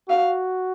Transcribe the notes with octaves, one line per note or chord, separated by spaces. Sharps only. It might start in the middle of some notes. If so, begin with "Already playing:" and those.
F#4 F5